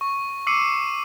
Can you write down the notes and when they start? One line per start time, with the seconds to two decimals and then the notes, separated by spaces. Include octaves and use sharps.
0.01 C#6
0.47 D6 E6 C7 C#7 D#7